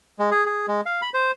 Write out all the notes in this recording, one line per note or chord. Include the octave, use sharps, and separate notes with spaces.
G#3
G#4
G#4
G#3
F5
B5
C5